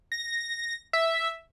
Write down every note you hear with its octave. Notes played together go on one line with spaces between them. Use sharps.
A#6
E5